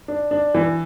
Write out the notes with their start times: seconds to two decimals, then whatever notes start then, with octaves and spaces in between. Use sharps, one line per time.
0.08 D4
0.31 D4
0.54 E3